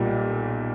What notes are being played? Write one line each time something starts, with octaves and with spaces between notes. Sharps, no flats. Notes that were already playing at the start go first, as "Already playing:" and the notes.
Already playing: B1 A#2 G3